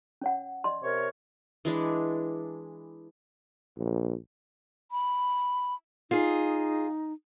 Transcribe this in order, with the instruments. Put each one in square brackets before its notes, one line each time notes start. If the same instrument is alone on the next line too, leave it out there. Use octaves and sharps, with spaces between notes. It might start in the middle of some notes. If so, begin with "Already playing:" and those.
[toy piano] C#4 C#5 F#5
D5 D#5 C6
[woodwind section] C3 A#4 C#5
[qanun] E3 G#3 D4
[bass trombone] A#1
[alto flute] B5
[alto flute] D#4 [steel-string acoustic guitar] F4 G#4